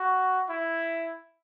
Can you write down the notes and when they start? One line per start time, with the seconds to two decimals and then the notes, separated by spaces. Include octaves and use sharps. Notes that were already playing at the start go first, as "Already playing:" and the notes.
Already playing: F#4
0.49 E4